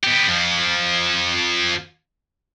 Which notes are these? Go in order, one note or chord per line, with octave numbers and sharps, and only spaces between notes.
B3 G4
F2 F3